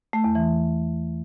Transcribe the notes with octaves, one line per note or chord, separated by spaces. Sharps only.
A3
E2
E3